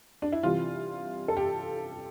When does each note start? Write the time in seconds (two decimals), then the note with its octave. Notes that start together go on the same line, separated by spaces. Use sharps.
0.22 D4
0.32 E4
0.43 C3 E3 G3 F4
1.28 A4
1.37 G4